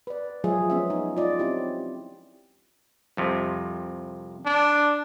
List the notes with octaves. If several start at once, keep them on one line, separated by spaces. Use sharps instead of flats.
B4 D5
F3 F#3 G#3 F4 G#4 E5
B3 C#4 E5
D#4
F4 D5 D#5
C4 C#4 E4 G4
C2 F2 C3
D4